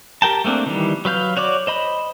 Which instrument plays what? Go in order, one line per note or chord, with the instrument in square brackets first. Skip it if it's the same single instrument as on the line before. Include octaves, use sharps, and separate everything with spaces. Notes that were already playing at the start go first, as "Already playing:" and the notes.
[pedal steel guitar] G4 A#4 G5 A5
A3 A#3 C4 D4
D#3 E3 G3
F#3 B4 F5 G6
F#4 C#5 D5 D6
C5 D#5 B5